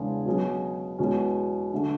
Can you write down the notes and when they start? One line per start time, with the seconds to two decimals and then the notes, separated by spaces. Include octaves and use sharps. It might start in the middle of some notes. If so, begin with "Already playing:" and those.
Already playing: E2 C#3 G#3 D4 G#4
0.26 B2 F#3 C#4 G#4
0.98 E2 B2 G#3 C#4 F#4
1.73 D3 A3 D4